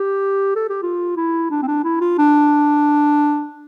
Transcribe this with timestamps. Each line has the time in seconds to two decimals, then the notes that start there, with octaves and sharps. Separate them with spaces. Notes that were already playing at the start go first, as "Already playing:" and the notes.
Already playing: G4
0.56 A4
0.69 G4
0.83 F4
1.17 E4
1.51 D4
1.62 C4
1.68 D4
1.84 E4
2.01 F4
2.18 D4